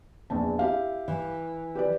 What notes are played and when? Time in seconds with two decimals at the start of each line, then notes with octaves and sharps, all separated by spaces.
0.30 A#1 E2 A5
0.59 E4 G4 F5
1.08 E3
1.75 G4 B4 D5